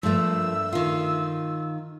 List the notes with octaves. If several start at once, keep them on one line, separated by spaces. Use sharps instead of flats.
G2 F3 A3 A#3 E6
D#3 F4